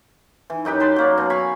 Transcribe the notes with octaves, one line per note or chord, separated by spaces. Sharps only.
E3
F#2 D#4 G4 B4
B4 A5 C6
F#3 A#3 D5
B2
F5 G#5 B5 C#6